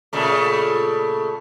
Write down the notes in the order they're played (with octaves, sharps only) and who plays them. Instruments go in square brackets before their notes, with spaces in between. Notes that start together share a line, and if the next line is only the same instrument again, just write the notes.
[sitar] A#2 C#3 A3